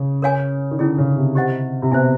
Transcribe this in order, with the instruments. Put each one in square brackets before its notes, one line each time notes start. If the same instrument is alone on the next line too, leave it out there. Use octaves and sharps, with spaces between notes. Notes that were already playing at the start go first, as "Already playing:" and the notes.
Already playing: [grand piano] C#3
[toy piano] A#4 C#5 F5 G#5
[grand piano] D#3
[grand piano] D3 [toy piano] C#4 E4 G#4
[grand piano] C#3
C3
[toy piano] G4 C5 D#5 F#5
[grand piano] C3
[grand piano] B2 [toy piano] C5 E5 G#5